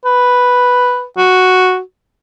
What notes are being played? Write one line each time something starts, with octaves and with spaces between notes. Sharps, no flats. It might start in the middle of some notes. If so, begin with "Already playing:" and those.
B4
F#4